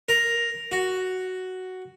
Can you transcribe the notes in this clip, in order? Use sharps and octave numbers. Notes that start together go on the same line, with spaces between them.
A#4
F#4